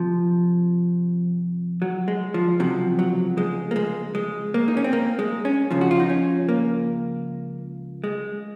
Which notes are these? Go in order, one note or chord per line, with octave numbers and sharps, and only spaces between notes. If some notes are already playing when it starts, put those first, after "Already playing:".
Already playing: F2 C3 F3
F#3
G#3
F3
C#2 C3 F3 F#3
F#3
G#3
A#3
G#3
G#3
A#3
D#4
C#4
C4
A#3
G#3
C#4
C#2 C#3 F3
F#4
F4
D#4
C#4
A#3
G#3